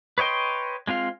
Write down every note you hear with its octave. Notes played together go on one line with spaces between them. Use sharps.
B4 C#5 D#5 G5 C6
G#3 C4 F4 F5